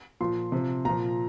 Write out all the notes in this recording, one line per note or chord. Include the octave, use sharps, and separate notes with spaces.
A#2 F3 C6
C3 F3
A#2 F3 A#5